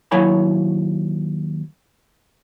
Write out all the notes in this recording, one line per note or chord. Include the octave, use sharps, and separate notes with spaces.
D#2 F#3 E4 C#5 G#5 B5